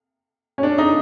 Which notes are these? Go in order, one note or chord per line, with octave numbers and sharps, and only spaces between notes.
C#4
D4
D#4